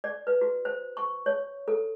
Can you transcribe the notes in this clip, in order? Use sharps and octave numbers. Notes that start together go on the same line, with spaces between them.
D5
B4
F#4
C5
C#6
C#5
A4